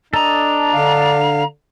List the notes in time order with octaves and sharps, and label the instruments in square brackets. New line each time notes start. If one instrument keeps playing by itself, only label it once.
[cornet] D4 [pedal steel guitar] A4 D#5 [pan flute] A#5
[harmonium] D3 F5